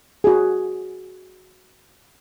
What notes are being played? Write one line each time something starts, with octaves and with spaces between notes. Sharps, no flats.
F#4 G#4